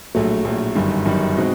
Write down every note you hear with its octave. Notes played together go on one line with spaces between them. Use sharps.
A#1 A2 F#3 A3
A#1 A2 F#3 A3
G1 F#2 D#3 G3
G1 F#2 D#3 G3
B2 G#3 C4 D#4 F#4